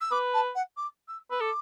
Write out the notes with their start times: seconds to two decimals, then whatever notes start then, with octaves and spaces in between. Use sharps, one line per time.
0.01 E6
0.11 B4 D6
0.34 A5
0.55 F#5
0.77 D6
1.08 E6
1.30 B4 E6
1.41 A4 D6